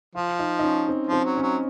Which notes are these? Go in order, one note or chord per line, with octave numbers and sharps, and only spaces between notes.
F3 F4
D#4
D#4
C#4
C4
F3
C4
F#3
C#4
F#3